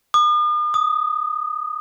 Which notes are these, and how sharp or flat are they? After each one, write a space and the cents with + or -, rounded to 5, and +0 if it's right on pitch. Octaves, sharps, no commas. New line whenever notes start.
D#6 -45
D#6 +5